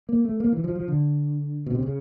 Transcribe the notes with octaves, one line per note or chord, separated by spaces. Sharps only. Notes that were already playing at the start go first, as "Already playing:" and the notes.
A#3
A3
A#3
E3
F3
F3
D3
B2
C3
C#3